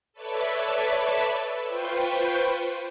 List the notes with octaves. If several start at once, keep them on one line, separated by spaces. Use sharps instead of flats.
A4 B4 C#5 D5 E5 A5
F4 B4 C5 G5 C#6